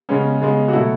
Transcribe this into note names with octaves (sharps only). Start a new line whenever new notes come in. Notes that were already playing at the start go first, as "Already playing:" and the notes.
C#3 G#3 B3 C#4
C#3 G#3 B3
F#4
B2 F#3 A3 E4